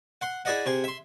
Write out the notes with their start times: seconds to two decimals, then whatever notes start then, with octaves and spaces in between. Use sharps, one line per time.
0.21 F#5 C6
0.45 E4 G#4 D5 D#5 F#5
0.66 C3 G#4
0.84 E5 C6